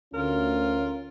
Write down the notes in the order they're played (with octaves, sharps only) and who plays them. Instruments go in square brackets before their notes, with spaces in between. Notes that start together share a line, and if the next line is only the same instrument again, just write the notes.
[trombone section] D2 [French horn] C#4 [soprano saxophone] F4 [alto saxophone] A#4